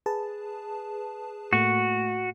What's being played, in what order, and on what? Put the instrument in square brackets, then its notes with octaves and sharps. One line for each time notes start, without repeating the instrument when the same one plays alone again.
[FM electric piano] G#4 B4 A5
[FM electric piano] A2 A3 A#3 [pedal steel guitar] F#4